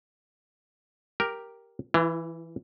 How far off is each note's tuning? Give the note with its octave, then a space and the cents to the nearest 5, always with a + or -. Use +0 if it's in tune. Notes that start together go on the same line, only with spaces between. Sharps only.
G4 +0 A#4 +0
E3 +0 E4 +45